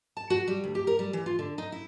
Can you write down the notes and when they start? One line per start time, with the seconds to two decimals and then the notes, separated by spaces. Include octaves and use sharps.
0.17 A5
0.30 F#4
0.48 G3
0.64 D2
0.75 G4
0.87 A#4
0.99 G3
1.13 E3
1.26 F4
1.39 D3
1.58 D#4
1.72 E4